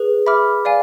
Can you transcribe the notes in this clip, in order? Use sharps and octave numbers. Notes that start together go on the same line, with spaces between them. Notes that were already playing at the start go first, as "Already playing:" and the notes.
Already playing: G#4 B4
E5 B5 D6 F6
D5 F5 G#5